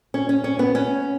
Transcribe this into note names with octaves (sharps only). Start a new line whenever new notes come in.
C#4
C#4
C#4
B3
C#4